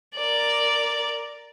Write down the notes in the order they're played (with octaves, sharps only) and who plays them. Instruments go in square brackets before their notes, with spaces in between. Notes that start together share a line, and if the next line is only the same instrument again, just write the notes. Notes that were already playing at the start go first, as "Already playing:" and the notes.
[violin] A#4 D5